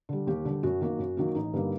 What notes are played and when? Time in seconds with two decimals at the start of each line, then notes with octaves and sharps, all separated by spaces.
0.09 D3 G3
0.27 D#2 G4
0.45 D3 G3
0.63 F#2 F#4
0.81 D#3 F#3 A#3
0.99 F#2
1.17 D#3 F#3 A#3
1.35 A1 D#4
1.54 G2 D3 G3 A#3